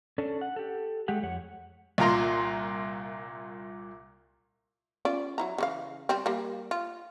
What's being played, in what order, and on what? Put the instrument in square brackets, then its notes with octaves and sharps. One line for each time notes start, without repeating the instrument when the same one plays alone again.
[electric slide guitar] C#4 D4 A4
F#5
G4 A4
G#3 A3 G4 F#5
F2 C#5 F#5
[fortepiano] C2 A#2 F4 A#5 C6
[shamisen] C#4 F4 D5
F#3 E4 A#5
C#3 E3 F5
G3 C4
G3 A#3
F4